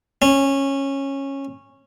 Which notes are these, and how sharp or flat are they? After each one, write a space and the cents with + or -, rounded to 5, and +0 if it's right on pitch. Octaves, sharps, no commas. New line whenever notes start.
C#4 -15